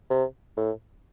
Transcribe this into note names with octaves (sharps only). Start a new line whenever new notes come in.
C3
A2